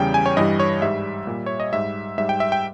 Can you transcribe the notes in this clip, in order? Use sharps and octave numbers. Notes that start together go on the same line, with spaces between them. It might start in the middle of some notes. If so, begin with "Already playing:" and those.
Already playing: E2 C#3 G3 G5
G#5
C#5
G2 E3 G3 D#5
C#5
G#2 G3 E5
A#2 G3
C#5
D#5
G#2 G3 E5
G#2 G3 E5
G5
E5
G5